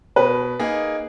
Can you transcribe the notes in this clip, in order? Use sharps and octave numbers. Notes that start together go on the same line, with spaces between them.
B2 B4
A#3 D#4 G#4